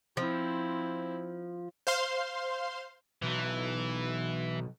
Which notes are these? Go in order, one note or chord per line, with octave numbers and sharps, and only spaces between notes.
F3 C4 E4
C5 F5 C6
B1 E3